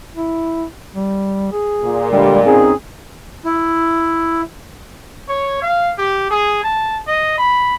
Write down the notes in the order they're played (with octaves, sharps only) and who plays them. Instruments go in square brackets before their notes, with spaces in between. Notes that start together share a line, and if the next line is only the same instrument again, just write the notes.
[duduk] E4
G3
G#4
[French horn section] A#2
[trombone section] D3 G3 [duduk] G#3
[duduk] C4 [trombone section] C#4 D#4 G#4
[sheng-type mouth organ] E4
[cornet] C#5
F5
G4
G#4
A5
D#5
B5